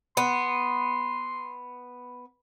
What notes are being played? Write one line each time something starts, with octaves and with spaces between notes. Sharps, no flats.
B3 C6